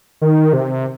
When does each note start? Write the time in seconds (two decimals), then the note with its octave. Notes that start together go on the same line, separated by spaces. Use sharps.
0.22 D#3
0.53 C3